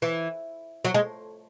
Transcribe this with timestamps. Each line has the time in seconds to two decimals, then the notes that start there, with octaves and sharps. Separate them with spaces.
0.02 E3
0.85 F#3
0.94 G#3